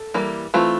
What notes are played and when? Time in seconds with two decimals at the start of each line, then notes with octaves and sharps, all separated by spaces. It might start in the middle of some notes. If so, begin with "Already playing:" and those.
Already playing: A4
0.14 E3 G3 A#3
0.54 E3 A3 C4 F4